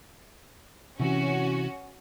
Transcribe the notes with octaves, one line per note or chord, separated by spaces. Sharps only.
C3 E3 C#4 F#4